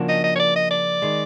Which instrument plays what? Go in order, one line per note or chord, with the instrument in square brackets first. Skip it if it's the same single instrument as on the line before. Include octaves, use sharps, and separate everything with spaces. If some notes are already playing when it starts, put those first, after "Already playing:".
Already playing: [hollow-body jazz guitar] C#3 F3 A#3 D4 F#4
[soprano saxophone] D#5
D#5
C#5
D5
D#5
D5
[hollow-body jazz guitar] D#3 G#3